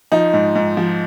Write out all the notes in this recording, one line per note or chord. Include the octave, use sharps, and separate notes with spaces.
F3 D#4
G#2
G#2
F3